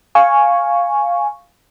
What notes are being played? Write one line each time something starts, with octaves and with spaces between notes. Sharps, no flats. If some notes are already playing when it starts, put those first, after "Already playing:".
F5 G#5 C#6